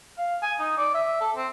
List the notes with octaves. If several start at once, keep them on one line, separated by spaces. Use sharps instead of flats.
F5
G#5
D#4
D5
E5
A4
C4